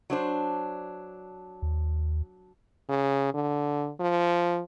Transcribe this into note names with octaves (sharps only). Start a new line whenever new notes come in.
F#3 D4 C5
D#2
C#3
D3
F3